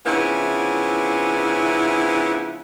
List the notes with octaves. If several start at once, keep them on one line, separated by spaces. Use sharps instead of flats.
C#3 F3 B3 C#4 D4 E4